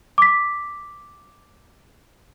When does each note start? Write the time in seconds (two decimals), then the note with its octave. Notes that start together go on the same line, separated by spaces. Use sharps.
0.18 D6 B6